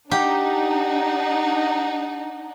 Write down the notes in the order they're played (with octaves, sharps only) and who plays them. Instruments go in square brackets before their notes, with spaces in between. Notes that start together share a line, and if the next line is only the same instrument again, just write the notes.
[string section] D4 D#4 [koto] G4 [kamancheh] F#5